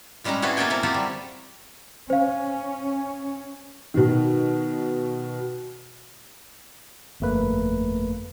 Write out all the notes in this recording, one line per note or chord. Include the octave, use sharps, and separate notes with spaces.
A2 G3 G#3 C#4 D#4 A#5
C4 E4 F#4 G#4 A4 B4
A#3 B3 F4 A4 G5 G#5
A#3 C4 E4
F#3 C4 F4 G4 A4 E5
G3
C#4 C5 F5
B2 D#3
G1 F2 A3 A#3 B4